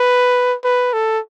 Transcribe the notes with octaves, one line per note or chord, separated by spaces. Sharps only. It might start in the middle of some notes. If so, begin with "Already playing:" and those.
Already playing: B4
B4
A4